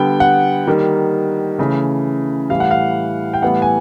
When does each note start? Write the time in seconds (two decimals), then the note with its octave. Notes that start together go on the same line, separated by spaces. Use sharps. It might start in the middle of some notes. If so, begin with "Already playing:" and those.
Already playing: D3 G3 B3 G5
0.20 F#5
0.67 D#3 G3 A#3
1.59 C#3 E3 A3
2.50 A2 E3 G3 F5
2.60 F#5
2.71 F5
3.34 G5
3.42 A2 E3 G3 B3 F#5
3.62 G#5